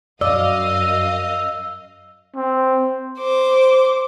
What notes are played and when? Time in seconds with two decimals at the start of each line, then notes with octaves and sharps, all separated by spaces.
0.21 F#2 D5 D#5 F5 E6
2.35 C4
3.18 C5 D6